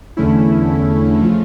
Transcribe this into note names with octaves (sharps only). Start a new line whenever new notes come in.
E2 D3 A3 C#4 E4
C#3 F3 A3 C#4 F4